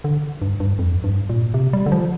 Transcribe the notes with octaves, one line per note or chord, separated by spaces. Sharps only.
D3
G2
G2
F2
G2
A#2
C3
G3
D3
F3